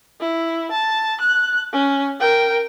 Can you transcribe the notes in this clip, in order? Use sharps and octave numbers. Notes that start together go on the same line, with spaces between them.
E4
A5
F#6
C#4
A#4 G5